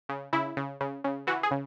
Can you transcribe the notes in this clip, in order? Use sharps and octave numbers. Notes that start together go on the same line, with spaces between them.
C#3
C#3 E4
C#3
C#3
C#3
E3 F#4
G#4
C#3